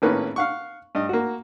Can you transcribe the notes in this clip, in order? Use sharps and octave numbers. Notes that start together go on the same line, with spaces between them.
G#1 A2 A#3 C#4 B4
F5 F#5 C#6
G2 D#5
A#3 F#4